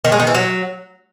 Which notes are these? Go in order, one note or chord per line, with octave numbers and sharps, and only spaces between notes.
D#3
G#3
D#3
E3
F#3